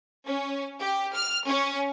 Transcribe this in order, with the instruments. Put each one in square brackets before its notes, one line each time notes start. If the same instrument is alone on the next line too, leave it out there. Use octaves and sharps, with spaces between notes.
[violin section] C#4
G4
F6
C#4